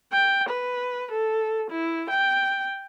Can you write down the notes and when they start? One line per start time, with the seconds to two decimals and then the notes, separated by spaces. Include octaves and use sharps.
0.12 G5
0.49 B4
1.11 A4
1.71 E4
2.10 G5